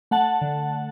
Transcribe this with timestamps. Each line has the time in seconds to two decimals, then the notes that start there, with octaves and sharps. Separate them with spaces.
0.11 A3 F#5 A5
0.41 D3